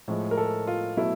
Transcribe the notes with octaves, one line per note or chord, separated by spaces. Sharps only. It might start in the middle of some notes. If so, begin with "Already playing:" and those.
A2 F3 G#3
A#4
A4
F4
B2 F#3 A3 E4